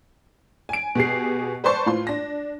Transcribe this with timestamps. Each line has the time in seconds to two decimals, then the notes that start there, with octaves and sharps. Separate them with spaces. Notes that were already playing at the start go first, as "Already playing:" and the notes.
0.69 G#5 D7
0.95 B2 G4 G#4 C7
1.64 B4 C5 D5 A5 C6 C#6
1.86 A2 F4 C6
2.07 D4 A#6